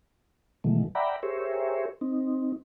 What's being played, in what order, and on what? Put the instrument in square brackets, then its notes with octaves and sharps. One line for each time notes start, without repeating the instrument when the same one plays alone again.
[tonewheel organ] B2 D#3 E3 F#3 G#3 A3
D5 E5 F#5 G5 A#5 B5
G4 G#4 A#4 C5 C#5 E5
C4 D#4